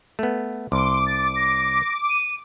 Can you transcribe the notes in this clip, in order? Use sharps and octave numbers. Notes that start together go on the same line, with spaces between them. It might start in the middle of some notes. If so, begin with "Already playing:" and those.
A3 B3
C2 C6 D6
A6
A#6
D#7